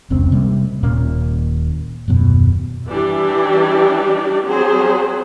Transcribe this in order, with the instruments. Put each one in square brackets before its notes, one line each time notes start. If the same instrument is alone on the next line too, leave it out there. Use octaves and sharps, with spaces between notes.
[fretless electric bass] F1 C#2 C4 C#4
C3 G3 A#3
D#1 A#2 A#3 C#4
D#1 F#2 B2
[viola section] E3 G3 D4 E4 G4 D5
F#3 C4 G#4 C5